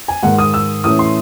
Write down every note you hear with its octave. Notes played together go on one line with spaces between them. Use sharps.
G#5
G#2 D#3 G#3 F#5
D#6
E6
A2 E3 A3 C#4 D#6
C6